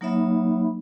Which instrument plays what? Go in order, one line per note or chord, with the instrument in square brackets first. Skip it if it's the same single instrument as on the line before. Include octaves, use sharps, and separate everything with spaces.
[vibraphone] F#3 A#3 D#4 C#5 E5 B5